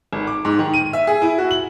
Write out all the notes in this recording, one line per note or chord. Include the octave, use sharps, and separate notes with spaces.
G#1
D6
G#2
D#3
D#7
E5
G#4
E4
F#4
F#7